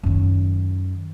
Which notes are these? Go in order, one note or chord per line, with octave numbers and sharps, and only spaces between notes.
F#2 D#3